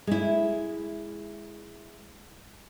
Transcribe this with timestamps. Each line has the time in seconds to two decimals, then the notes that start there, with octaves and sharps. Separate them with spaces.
0.07 G#3 E4